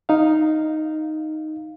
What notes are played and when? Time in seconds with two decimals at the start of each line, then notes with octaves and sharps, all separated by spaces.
0.09 D#4 F5